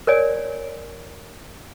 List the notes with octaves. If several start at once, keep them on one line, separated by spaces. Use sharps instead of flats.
A#4 C#5 D5 G#5